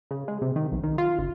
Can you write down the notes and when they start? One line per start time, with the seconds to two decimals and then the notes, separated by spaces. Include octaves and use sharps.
0.11 C#3
0.28 G#3
0.42 C3
0.56 D#3
0.72 B1
0.83 D#3
0.98 F4
1.18 F#1